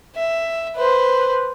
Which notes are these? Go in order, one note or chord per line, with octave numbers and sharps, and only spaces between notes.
E5
B4 C5